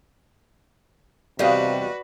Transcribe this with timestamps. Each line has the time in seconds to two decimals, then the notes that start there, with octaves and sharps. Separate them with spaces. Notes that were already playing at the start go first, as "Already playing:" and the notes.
1.39 E2 C3 G3 F#4 B4 D#5 F5